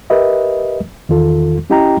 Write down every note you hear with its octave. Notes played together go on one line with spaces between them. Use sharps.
G4 A#4 B4 D#5 E5
E2 D#3 F4 A4
C#4 E4 G4 D#5 G5 A#5